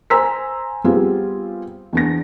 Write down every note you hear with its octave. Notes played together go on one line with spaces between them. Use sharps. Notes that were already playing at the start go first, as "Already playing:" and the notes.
C5 G#5 A#5 C6 E6 B6
G3 B3 C4 F4 G4 G#4
E2 D4 A#6